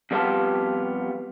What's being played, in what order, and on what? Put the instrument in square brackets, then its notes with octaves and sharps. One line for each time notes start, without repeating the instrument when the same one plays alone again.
[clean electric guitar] F2 G3 B3 F4 G4 A5